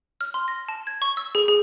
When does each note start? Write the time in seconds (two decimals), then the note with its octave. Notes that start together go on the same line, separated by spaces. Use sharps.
0.21 F6
0.34 C6
0.48 A#6
0.68 A5
0.87 G#6
1.02 C#6
1.17 E6
1.35 G#4
1.48 G#4